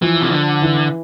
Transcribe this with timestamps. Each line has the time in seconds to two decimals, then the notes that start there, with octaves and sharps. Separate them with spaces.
0.02 E3 F3
0.22 C3
0.31 D3
0.62 E3